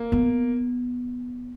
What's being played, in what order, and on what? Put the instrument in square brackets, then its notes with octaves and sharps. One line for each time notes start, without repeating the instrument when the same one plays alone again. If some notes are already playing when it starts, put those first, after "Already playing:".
Already playing: [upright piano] A#3
[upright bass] B3